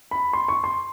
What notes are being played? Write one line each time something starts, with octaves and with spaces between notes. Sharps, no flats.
B5
C6
C#6
C6